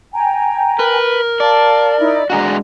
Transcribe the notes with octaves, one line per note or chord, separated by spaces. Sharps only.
G5 G#5 A#5
A#4 B4
D5 F5 A5
D#4 E4 D#5
G#3 D4 F#4 D#5 G#5 A#5